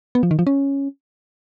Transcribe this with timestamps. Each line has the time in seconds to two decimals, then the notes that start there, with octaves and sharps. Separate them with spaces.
0.15 B3
0.23 F3
0.31 D#3
0.39 F3
0.47 C#4